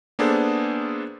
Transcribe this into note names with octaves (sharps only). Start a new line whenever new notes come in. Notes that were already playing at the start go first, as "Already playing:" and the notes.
A#3 B3 D4 G#4 A4 C5